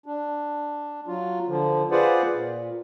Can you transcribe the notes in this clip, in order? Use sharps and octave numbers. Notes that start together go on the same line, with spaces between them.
D4
F#3 F4
D3 F3
F4 G#4 B4 C5 D5 F#5
A#2